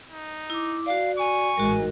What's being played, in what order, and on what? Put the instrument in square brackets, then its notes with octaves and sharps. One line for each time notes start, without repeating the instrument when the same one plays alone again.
[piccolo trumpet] D#4
[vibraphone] E4 D6
[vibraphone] F#4 D5 [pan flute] F5
[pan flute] G#5 [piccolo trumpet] C#6
[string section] A1 G#2 [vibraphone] F#4 A#4